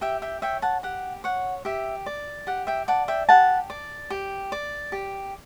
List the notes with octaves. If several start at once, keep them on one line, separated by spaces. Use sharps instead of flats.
G4 E5 G5
E5 G5
C#5 E5 G5
F#5 A5
G4 F#5
C#5 F#5
G4 E5
D5
G4 F#5
E5 G5
D5 F#5 A5
E5 G5
G4 F#5 A5
D5
G4
D5
G4